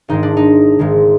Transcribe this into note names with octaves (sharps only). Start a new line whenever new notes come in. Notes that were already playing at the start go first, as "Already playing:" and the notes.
G#1 G#2 D#3 G#3 D#4
D4
D#4
G#1 G#2 D#3 G#3